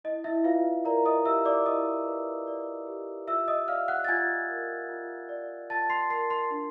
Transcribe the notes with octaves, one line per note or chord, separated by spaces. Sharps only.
E4 D#5
E4 E5
F4 B4 F5
A#4 D5 A#5
D#5 D#6
G4 E5 E6
D5 D6
E4 D#5 D#6
B4
D5
G4
F4 E5 E6
D#5 D#6
D5 F5 F6
F#5 F#6
A6
F4 G#5 G#6
A#4
F4
D5
F4 A5 A6
C6 C7
A#4 C6 C7
C6 C7
D4